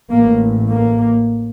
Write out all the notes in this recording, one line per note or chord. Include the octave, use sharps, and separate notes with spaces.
A1 A2 A#3
A#3